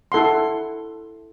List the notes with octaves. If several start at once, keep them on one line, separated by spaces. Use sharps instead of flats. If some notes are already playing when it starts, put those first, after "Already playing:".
E4 A4 F#5 C6